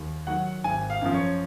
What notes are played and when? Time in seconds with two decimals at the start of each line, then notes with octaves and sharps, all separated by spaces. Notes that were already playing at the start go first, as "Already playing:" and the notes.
Already playing: D#2
0.27 D#3 F#3 F#5
0.64 G#1 G#5
0.90 F5
1.01 F#2 F3
1.14 C#5